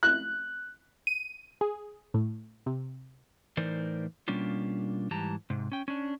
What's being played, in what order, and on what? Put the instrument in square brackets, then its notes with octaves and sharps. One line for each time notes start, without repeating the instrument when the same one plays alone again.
[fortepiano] F#6
[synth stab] D#7
G#4
A2
C3
[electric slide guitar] A2 E3 D#4 A#4 C5 D5
B2 G3 A#3 C#4 D4 F4
G#2 E3 G3 G4 A5 A#5
G#2 C3
C#4 G5
C#4 D4